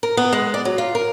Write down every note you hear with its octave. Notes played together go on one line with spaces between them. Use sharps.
A#4
B3
G#3
D5
F#3
F4
A#4